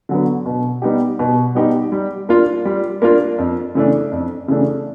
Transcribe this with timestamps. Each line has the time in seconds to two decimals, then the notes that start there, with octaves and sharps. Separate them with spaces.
0.09 D3 F#3 B3
0.46 B2
0.82 G3 B3 D#4 G4
1.19 B2
1.55 G3 B3 D#4 G4
1.92 G3
2.29 A#3 D4 F4
2.65 G3
3.02 A#3 D4 F4
3.38 F2
3.75 C#3 E3 A3 D4
4.12 F2
4.48 C#3 E3 A3 D4